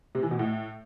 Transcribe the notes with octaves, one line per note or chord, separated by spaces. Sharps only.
C3
E3
B2
A2